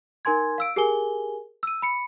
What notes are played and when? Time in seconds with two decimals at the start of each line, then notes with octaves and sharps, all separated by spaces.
0.25 D#4 A#4 G#5 C6 G#6
0.58 F5 E6 D7
0.76 G4 G#4 A#4 G#5 G7
1.63 E6 D#7
1.82 B5 C#7